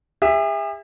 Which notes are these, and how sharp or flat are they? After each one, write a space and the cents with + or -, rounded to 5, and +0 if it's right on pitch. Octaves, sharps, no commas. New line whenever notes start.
G#4 -45 E5 +0